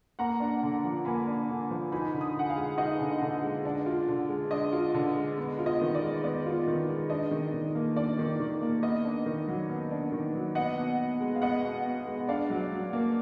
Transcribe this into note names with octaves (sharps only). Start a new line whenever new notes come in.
A#3 F#5 A#5
D4
D3
F3
A#3 G#5 B5
D4
D3
F3
D#4 G#5 B5
D3
B5 D#6
D3 F#5
F5 G#5
G#3
D#4 D#5 F#5
D3
D3
G#3
D4
F4
D3
G#3
D4 D#5
F4
D3
G#3
B3
F4
D#5
D#3
D5
G#3
B3 D5
F4
D#3
G#3
D4 D#5
D#3
D#3
A#3
D4 D5
D#3
D#3
A#3
B3 D#5
D4
D#3
F#3
B3
D4
D#3
F#3
B3 D#5 F#5
B2
B2
G#3
F5
B3 D#5 F#5
B2
B2
G#3
D4 D5 F5
F#3
F#3
A#3